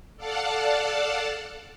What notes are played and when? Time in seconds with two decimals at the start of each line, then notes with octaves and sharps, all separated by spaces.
0.16 A4 D5 F5 F#5 A5